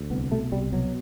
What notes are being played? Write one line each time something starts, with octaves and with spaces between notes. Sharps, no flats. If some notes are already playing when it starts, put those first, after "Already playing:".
Already playing: D2
C2 B3
B2 A3
C2 G3
B2 F#3